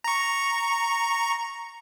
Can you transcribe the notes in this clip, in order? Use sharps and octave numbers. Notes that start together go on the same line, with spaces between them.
A#5 C#6